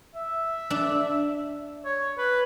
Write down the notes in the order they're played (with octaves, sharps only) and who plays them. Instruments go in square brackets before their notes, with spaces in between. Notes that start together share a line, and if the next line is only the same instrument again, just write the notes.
[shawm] E5
[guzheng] D4
[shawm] C#5
B4